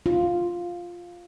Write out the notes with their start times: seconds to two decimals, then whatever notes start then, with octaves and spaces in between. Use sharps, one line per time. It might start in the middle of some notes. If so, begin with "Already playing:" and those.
0.06 F4